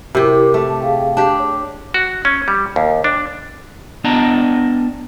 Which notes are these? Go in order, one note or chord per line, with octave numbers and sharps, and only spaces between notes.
C3 E4 G4 A#4
A3 A5
G#4 F5 G5
D4 G4
C#5
F#4
C#4
G3
D#2
D4
B3 D4 D5 D#5 A5 A#5